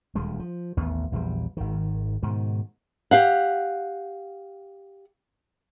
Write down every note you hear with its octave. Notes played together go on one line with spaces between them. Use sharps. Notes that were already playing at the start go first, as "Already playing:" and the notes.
D#1 D2 G3 G#3
F3
A1 D#2 B3
A#1 E2 F3 G3
G#1 D#3
G#2 B2 D#3
G4 F5 F#5